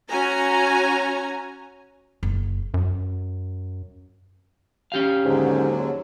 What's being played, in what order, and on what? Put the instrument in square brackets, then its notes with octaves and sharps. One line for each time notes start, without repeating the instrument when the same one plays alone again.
[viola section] C#4 F#4 G#5 A#5
[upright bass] F#1
[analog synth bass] F#2
[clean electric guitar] C#4 G4 F5
[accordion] D#2 D3 F#3 [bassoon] G#2